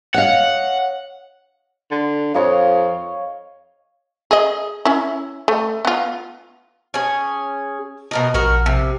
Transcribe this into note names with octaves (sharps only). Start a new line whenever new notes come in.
C#5 D#5 F5 F#5
D3
F2 C#5 D#5 F5
G#4 D#5
C#4 E4
A3
B3 F4
C#4 G#4
B2 A#4 D#5
A#1 F#4 A#4
C3